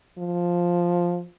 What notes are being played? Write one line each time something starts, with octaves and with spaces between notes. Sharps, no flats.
F3